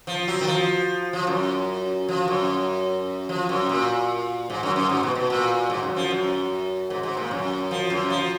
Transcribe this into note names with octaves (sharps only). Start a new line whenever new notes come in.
F3
F#3
D#3
F3
F3
F#2
F3
F#2
F3
F#2
A#2
G#2
F#2
F#2
G#2
B2
B2
A#2
G#2
F#2
F3
F#2
G#2
G#2
A#2
F#2
F3
F#2
F3